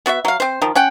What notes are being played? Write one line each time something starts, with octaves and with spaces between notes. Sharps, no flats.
B3 F#4 D5 E5
F#3 F5
C4 C5
D#3 F3
C#4 F#5 G5